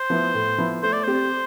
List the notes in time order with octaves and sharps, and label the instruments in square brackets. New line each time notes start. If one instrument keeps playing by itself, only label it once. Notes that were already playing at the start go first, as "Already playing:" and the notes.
Already playing: [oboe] C5
[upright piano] F3 B3 E4
A2
F3 B3 E4
[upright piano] A3 [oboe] C5
[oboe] D5
[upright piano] C4 G4 [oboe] C5